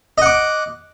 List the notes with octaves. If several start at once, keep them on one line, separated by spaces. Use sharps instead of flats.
D#5 F#5 D6